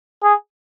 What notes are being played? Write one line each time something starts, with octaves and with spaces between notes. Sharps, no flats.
G#4